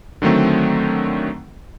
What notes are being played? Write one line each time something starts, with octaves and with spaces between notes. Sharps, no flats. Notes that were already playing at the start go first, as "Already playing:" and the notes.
D3 D#3 F#3 A3 C4